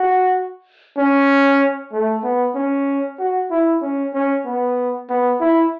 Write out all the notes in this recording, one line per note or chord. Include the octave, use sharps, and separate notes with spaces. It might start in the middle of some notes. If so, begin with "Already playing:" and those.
Already playing: F#4
C#4
A3
B3
C#4
F#4
E4
C#4
C#4
B3
B3
E4